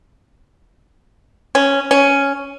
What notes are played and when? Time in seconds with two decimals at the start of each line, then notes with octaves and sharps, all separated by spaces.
1.55 C#4
1.91 C#4